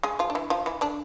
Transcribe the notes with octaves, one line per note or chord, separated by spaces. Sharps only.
G#3 G#4
F3 F4
D4
E3 E4
F3 F4
E3 E4
D3 D4